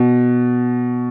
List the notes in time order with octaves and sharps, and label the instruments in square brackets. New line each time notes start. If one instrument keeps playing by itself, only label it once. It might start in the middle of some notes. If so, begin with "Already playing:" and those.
Already playing: [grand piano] B2